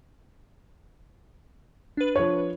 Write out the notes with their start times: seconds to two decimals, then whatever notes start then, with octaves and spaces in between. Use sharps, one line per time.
1.97 D4 B4
2.16 F3 C#5